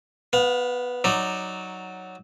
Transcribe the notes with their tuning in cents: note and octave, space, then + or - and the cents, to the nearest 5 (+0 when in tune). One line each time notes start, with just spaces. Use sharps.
B3 +0 F5 +35
F#3 +0 D#4 +0 D5 +15